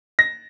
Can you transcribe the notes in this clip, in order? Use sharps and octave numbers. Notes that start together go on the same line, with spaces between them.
A#6